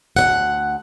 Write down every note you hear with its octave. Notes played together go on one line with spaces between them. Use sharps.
D2 C#3 F#5